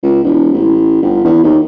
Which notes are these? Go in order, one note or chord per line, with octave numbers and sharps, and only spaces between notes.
C#2
E1
A1
G1
E2
D#2